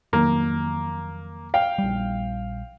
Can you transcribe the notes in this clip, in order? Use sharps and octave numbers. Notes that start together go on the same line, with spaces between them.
F2 D#3 F#3 A#3
F5 G5
A#1 G3